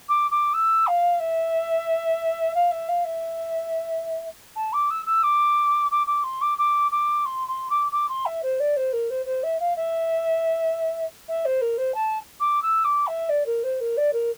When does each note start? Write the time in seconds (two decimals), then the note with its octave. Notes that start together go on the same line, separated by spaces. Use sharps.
0.09 D6
0.31 D6
0.53 E6
0.87 F5
1.20 E5
2.55 F5
2.71 E5
2.88 F5
3.04 E5
4.56 A5
4.73 D6
4.90 E6
5.06 E6
5.23 D6
5.91 D6
6.07 D6
6.23 C6
6.41 D6
6.58 D6
6.91 D6
7.25 C6
7.48 C6
7.70 D6
7.92 D6
8.09 C6
8.26 E5
8.43 C5
8.60 D5
8.76 C5
8.93 A#4
9.10 C5
9.26 C5
9.43 E5
9.59 F5
9.76 E5
11.28 E5
11.45 C5
11.61 A#4
11.78 C5
11.94 A5
12.40 D6
12.62 E6
12.84 D6
13.07 E5
13.29 D5
13.46 A#4
13.63 C5
13.80 A#4
13.97 D5
14.13 A#4